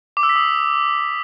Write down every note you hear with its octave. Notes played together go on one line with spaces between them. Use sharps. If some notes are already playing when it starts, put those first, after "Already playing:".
D6
E6
B6
D#6